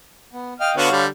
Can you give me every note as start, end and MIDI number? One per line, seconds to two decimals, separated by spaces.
0.33 0.54 59
0.60 0.75 75
0.60 0.75 77
0.60 0.75 79
0.60 0.71 89
0.77 0.90 50
0.77 0.90 59
0.77 0.90 66
0.77 1.03 73
0.77 1.03 77
0.91 1.07 50
0.91 1.07 55